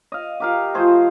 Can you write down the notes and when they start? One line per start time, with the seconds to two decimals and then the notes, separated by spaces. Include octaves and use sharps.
0.12 D#5 F5
0.40 G4 A#4 F5
0.74 F3 A3 G#4 C5